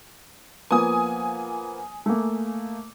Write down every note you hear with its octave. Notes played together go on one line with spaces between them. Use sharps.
F3 A#3 B3 G#5 D#6
A3 A#3